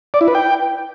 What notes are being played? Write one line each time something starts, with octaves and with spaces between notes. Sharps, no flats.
D5
E4
B4
G5